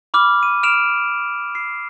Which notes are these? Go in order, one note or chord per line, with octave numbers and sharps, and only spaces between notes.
B5 D6 F6
D#7
D#6 F6 D7 E7 F7
C7